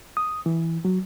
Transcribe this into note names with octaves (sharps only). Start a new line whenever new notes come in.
D#6
E3
F#3